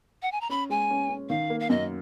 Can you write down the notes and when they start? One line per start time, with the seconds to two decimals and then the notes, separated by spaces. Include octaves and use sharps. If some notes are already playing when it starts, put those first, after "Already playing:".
0.22 F#5
0.32 G#5
0.41 A#5
0.49 C#4 B5
0.69 G#3 G#5
0.90 C#4
1.09 C#4
1.29 D#3 F5
1.50 A#3
1.60 F5
1.69 F#2 D#5